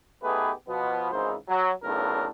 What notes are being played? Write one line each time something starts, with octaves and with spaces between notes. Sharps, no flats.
A3 B3 D#4 G4 G#4 B4
B2 F3 B3
G#1 G#2 C#3 E3 D#4 C5
F#3
B1 A2 C#3 A3 D4 A#4